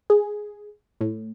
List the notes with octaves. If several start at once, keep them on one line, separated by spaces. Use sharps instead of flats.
G#4
A2